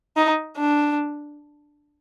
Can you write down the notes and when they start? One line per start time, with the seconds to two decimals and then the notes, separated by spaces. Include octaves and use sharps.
0.17 D#4
0.58 D4